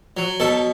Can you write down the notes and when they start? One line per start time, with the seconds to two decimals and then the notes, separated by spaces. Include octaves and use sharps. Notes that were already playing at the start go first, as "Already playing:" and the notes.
0.17 F#3
0.40 B2 A4